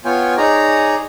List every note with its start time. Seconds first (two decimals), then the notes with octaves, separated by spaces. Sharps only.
0.05 B3 F4 C#5 G5 G#5
0.37 D#4 G#4 C#5 D5 A#5